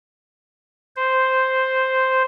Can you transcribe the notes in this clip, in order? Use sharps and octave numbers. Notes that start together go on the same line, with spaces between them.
C5